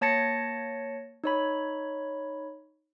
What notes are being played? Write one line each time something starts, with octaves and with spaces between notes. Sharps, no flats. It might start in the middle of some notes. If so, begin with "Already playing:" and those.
A#3 C#5 A5 A6 A#6 C#7
D#4 C#5 B5